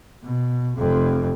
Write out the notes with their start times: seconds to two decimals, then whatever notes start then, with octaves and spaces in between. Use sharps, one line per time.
0.23 B2
0.77 F1 F2